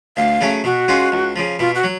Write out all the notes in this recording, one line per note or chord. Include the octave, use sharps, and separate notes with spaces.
D2 F5
C#3 F#3 A3 C#4
B2 F#4
G#3 C#4 F4
C#2
C#3 F3
B2 F4
F#4
F#3